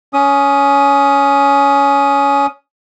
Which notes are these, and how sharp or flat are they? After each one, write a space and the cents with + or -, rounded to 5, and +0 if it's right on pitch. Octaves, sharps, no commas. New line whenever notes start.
C#4 +15 D#6 +0